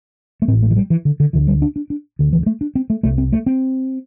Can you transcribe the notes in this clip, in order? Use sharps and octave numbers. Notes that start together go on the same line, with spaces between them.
A3
A1 A2 C4
A3
E3
G3
E3
D3
D3
D2 D3 E3
G3
D4
D4
D4
D2 D3
E3
A3
D4
C4
A3
C2 C3 A3
C4
A3
C4